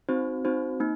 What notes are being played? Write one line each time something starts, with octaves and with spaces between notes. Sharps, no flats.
C4 D#4 F#4 C5
C4 D#4 F#4 C5
A#3 D#4